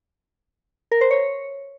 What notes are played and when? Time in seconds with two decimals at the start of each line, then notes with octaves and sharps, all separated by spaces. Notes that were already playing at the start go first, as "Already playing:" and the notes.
0.91 A#4
1.01 C5
1.11 C#5